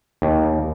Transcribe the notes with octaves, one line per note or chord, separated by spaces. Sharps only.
D#2